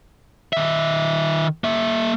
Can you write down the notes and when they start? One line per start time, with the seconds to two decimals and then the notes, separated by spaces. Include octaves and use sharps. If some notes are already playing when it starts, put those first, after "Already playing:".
0.53 D#3 E5
1.64 A#3 E5